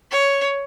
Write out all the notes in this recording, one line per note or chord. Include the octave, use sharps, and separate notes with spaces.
C#5